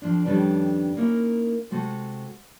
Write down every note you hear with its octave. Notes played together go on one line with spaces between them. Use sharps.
F2 F3 D4
F2 D#3 G3 C#4 D4 B4
A#3 C#4 D#4 E4 A#4
C3 G#3 A3 F#4